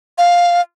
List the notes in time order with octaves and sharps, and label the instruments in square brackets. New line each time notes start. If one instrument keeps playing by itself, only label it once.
[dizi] F5